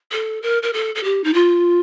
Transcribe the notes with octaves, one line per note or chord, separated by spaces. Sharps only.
A4
A#4
A#4
A4
A4
G4
D#4
F4